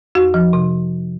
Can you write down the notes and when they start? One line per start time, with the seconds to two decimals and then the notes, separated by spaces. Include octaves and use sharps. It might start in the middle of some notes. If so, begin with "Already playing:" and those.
0.15 F2 F#4
0.34 F3
0.53 C3